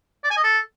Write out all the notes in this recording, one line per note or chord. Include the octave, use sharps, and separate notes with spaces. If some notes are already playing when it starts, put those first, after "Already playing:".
D5
G#5
D#5
A4